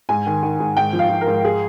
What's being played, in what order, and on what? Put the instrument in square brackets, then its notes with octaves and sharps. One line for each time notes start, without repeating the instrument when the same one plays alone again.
[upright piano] G#2 G#5
D#3
D#3
G#2
G#2 G5
F3
F5
F3
A#4
G#2
G#4